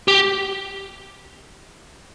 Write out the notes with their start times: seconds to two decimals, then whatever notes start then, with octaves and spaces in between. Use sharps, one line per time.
0.08 G4